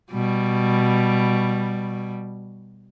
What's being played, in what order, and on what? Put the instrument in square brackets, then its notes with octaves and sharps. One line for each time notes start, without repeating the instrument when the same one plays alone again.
[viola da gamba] B2 G3